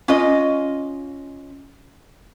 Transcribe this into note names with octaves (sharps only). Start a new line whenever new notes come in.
C#4 F4 D#5